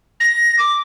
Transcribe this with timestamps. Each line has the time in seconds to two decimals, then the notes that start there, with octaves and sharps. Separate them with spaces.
0.20 A#6
0.58 D6